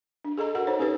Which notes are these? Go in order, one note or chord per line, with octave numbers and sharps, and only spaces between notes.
D4
G#4 A4 D#5 A#5
F#4 A4 A#4 F#5
D#4 C5 C#5
C#4 G4 A4 B4 C#5